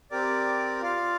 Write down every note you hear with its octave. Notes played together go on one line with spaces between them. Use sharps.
C4 G4 A#4 D5
F4 D5 F5